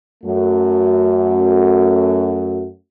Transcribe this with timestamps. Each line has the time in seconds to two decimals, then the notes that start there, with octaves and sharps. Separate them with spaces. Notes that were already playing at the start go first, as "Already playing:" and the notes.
0.24 F#2 A3 F#4